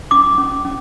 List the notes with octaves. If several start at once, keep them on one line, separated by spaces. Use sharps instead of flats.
C#4 D6
C#4
C#4